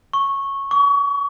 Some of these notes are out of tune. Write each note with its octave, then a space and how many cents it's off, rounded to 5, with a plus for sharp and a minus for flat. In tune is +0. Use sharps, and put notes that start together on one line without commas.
C#6 -10
C#6 +35